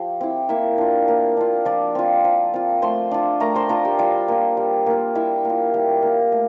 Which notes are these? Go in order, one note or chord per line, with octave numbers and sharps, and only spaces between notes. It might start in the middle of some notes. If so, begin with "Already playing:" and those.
Already playing: F3 G4 G5
C4 E4
A#3 E4 E5
D4 F4
A#3
D4 F4
F3 D4 D5
C4 F4
F3
C4 F4
A3 C5 C6
D4 F4
A3 A#4 A#5
C5 C6
D4 F4 A#4 A#5
G4 G5
G3 F4 F5
A#3 F4
G3
A#3 F4
G3 E4 E5
A#3 F4
G3 G4
A#3 F4
A3